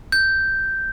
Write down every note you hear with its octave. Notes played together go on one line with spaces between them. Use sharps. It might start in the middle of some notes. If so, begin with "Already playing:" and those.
G6